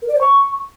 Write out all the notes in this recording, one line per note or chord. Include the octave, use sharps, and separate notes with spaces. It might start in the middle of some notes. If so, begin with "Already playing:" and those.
A#4
D5
C5
C#6